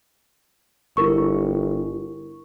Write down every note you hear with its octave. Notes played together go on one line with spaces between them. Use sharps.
G1 E4 A#4 C#6